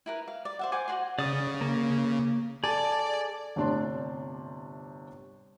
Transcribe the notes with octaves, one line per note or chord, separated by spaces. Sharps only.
E4 A#4 B4
F5
D5
C5 E5 F#5
C5 F#5 G#5 D6
F#4 G#4 F#5 C6
C#3 D5 D#6
A#3
G#4 A4 D5
G1 A2 C3 D4 A5 C6